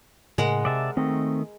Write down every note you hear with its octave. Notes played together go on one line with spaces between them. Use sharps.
A2 C#3 G#3 A#4 F#5
C3 D5 E5 A5
D#3 A3 C4 D#5